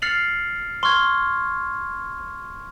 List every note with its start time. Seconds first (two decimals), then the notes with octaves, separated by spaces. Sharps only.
0.02 F6 A6 C7 C#7 F7 F#7
0.83 C6 C#6 F6 G#6